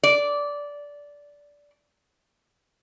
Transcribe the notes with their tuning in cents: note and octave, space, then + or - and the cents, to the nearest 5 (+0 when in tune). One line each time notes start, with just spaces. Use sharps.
D5 -15